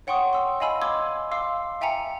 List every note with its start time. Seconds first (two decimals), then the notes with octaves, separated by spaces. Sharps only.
0.07 C#5 F#5 G5 C6 C#6 D#6
0.33 C6 E6
0.60 D#5 F5 G#5 B5 E6
0.82 C6 D6 E6 G#6
1.31 F5 C6 D6 E6
1.81 E5 G5 G#5 A#5 C#7